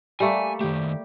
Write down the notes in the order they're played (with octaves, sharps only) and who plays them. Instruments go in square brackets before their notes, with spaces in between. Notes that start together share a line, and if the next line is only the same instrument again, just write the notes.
[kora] G3 A3 A#3 [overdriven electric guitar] G#5
[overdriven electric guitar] D#3 A3 [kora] G4